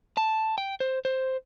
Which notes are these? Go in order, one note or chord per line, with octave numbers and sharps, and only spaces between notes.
A5
G5
C5
C5